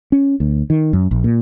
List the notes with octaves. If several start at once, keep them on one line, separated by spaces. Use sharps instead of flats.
C#4
D2
D#3
F#2
A#1
A#2